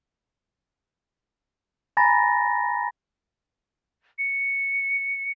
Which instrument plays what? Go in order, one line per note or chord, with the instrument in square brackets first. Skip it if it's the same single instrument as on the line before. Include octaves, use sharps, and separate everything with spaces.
[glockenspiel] G#5 A#5 B5 A6 A#6
[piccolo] C#7